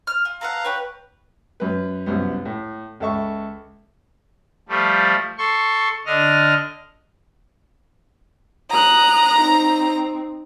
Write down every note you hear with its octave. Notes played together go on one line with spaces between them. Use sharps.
F6
F4
A4 B4 F5 F#5 A#5
G4 B4 C#5
F#2 B4
C2 F#2 B3
A2
C#2 A4 E5 C#6
F3 G3 A3
A4 C6 C#6
D3 D4 D#5 F6
A#5 D#6 F#6
C4 D#4